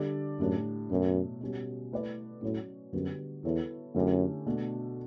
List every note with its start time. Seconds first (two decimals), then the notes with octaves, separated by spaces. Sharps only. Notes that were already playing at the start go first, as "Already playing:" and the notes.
Already playing: D3 G3 D4 A4 D5
0.40 F#2 A2 G3 D4
0.90 F#2 B2 F#3 A3
1.41 B2 G3 C#4
1.92 A3 E4 B4 D5
2.42 A2 F#3 C#4 F#4 C#5
2.93 F#2 D3 G3 B3 F#4
3.44 E2 B3 E4 A4 C#5
3.94 F#2 D3 A3 C#4 E4 G4
4.46 B2 A3 D4